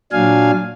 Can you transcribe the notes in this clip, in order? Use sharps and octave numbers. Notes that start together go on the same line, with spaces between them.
A#2 F#3 D4 F5 G#5